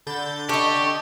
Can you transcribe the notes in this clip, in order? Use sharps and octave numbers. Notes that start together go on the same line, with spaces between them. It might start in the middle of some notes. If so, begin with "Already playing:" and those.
D3 B5 G6 A6
G4 A4 D#5 C#6